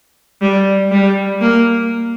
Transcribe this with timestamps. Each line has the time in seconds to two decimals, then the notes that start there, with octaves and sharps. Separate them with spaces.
0.42 G3
0.91 G3
1.41 A#3